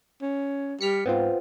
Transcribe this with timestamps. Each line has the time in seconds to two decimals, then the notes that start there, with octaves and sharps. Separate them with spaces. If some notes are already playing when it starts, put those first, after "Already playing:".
0.22 C#4
0.81 G3 F6 B6 C#7
1.06 G#2 B3 C4 F4